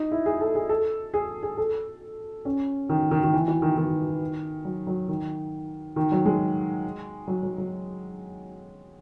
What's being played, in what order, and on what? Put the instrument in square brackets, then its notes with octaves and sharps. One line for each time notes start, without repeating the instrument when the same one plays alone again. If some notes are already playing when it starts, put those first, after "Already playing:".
Already playing: [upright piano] D#4
E4
G#4
A4
G#4
A4
G#4
G#4
A4
C#4
D#3
D#3
D#3
E3
E3
D#3
D#3
F#3
F#3
D#3
D#3
F#3
G#3
F#3
F#3
F#3